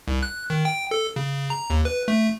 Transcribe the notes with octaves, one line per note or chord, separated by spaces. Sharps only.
C2
F#6
D#3
G5
A4
C#3
A#5
D#2
B4
A3